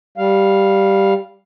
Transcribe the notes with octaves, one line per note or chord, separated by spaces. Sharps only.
G3 F5